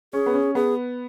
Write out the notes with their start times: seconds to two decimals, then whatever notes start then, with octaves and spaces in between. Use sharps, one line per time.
0.13 C#4 G#4
0.26 B3
0.34 C#4
0.55 B3 G#4